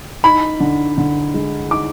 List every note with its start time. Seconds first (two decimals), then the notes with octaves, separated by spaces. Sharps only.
0.24 D#4 B5
0.60 D3
0.98 D3
1.34 G#3
1.71 D#4 D6